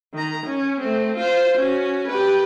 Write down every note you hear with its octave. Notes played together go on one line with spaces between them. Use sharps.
D#3 A#5
C#4
A3 C4
F4 C5
C#4 F#4
G4 B4